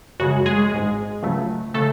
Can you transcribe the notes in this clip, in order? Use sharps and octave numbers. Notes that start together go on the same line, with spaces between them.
F#2 C#3 G#3 F#4
G#3 G#4
G#1 G#2 G#3
C#2 C#3 F#3 A3
C#3 F#3 A3 A4